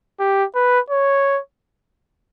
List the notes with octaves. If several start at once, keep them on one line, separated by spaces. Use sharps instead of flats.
G4
B4
C#5